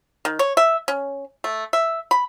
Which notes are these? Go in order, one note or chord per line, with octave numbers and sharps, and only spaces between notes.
D#3
C#5
E5
C#4
A3
E5
B5